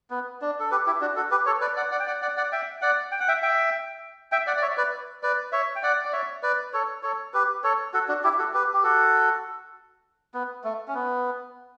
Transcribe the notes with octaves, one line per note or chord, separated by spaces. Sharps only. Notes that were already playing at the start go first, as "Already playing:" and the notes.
B3
D4
A4
G4 B4
E4 G4
D4 F#4
F#4 A4
G4 B4
A4 C#5
B4 D5
D5 F#5
D5 F#5
G5
D5 F#5
D5 F#5
D5 F#5
E5 G5
D5 F#5
G5
F#5
E5 G5
E5 G5
E5 G5
D5 F#5
D5
C#5 E5
B4 D5
B4 D5
C#5 E5
G5
D5 F#5
D5
C#5 E5
B4 D5
A4 C#5
A4 C#5
G4 B4
A4 C#5
F#4 A4
D4 F#4
E4 G4
F#4 A4
G4 B4
G4
F#4 A4
B3
A3
C#4
B3